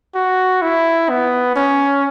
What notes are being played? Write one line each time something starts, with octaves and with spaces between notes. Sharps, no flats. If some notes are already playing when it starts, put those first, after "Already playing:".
F#4
E4
B3
C#4